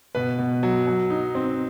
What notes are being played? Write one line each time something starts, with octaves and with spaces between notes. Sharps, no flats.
B2 B4
B2
F#3
F#3
D#4
C4